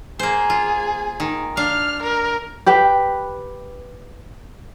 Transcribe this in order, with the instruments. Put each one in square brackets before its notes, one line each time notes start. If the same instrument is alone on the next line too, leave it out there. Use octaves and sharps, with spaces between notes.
[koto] A#3 C5 [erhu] G#4
[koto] F4
D#3
[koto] D4 F5 [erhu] F6
[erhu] A#4
[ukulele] G4 B4 G5